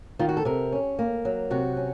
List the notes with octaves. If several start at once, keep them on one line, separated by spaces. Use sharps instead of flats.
D#3 F4
F#4
A4
C3 A#4
C#4
A#3
F#3
C3 F#4
C#4